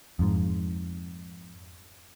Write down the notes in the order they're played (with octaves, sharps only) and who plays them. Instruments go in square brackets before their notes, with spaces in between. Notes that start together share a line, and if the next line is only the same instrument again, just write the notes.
[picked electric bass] F2 G#2